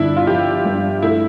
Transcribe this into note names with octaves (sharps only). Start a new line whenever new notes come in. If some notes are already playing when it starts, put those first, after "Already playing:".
Already playing: G1 D3 D4 E4
F4
F3 G4
G2
A3 E4